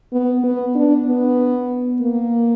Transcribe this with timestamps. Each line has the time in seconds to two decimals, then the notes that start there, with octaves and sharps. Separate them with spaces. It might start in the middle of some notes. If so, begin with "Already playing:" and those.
0.13 B3
0.44 B3
0.75 D4
1.07 B3
2.01 A#3